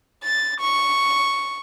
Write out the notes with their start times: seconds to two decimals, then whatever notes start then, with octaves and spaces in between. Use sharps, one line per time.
0.24 A6
0.60 C#6